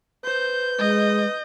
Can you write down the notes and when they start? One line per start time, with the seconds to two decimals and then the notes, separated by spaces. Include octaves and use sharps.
0.25 B4 C5 G6
0.79 G#3 D#5